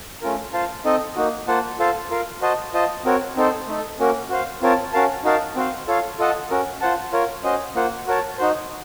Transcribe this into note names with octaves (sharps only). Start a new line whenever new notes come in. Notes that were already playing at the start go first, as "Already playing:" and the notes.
A3 C#4 F4 A#4
F4 C5 F5 A5
C4 D#4 A4 D#5
A#3 D#4 F#4
A#3 F4 C5 F#5 A5
F4 A4 C5 F5 A5
F4 A#4 F5
F#4 C5 D#5 A5
F4 C5 D#5 A5
C4 F#4 A#4 C#5
C4 D#4 A4 C5
A3 D#4 A4
A#3 C#4 F#4 A#4
F#4 C5 F5
C4 F4 A#4 C#5 A5
C#4 F#4 A#4 F5 A5
D#4 F#4 A#4 F5 A5
C4 F#4 C5 F5
F4 A4 C#5 F5
F4 A4 D#5 F#5 A5
C#4 F#4 A#4
F4 C5 F#5 A5
F4 A#4 C#5
C#4 F#4 C5 D#5
A#3 F4 C5 F#5
F#4 A#4 C#5 A5
D#4 F#4 C5